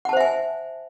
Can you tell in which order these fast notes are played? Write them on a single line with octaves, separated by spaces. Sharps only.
F#5 A5 C5 E5 G#5